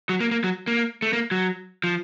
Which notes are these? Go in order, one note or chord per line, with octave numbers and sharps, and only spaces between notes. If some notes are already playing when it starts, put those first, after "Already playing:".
F#3
A#3
A#3
F#3
A#3
A3
A#3
F#3
F3